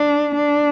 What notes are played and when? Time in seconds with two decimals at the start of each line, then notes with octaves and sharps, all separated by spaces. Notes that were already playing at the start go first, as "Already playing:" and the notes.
Already playing: D4
0.35 D4